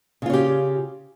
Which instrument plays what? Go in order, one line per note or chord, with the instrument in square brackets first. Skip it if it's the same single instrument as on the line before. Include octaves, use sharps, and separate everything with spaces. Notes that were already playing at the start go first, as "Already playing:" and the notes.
[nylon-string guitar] C#3
F4
C#4
G4